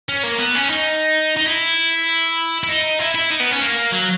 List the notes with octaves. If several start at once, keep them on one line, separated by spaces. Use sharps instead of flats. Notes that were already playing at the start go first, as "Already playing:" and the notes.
C#4
A#3
B3
C#4
D#4
D#4
E4
E4
D#4
E4
E4
D#4
B3
C#4
A#3
F#3